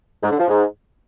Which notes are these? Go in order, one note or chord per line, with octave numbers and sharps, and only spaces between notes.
G#2
D3
F3
G#2